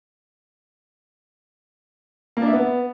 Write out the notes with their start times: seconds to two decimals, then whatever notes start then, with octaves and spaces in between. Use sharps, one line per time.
2.37 A#3
2.42 D4
2.47 E5
2.53 B3